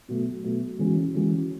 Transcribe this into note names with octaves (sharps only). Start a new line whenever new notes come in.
B2 F#3 A3
B2 F#3 A3
E3 G#3 C#4 F#4
E3 G#3 C#4 F#4